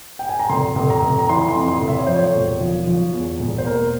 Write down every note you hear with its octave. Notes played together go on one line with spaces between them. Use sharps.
G5
G#5
A#5
F1 C6
F1
A#5
F1
A#5
E3 C6
C6
F2
C6
F1
E5
C#5
F3 C5
C#5
E1
F3
F3
E2
E1
C5
A#3 A#4